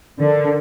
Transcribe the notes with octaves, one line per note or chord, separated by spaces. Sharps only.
D3 A#4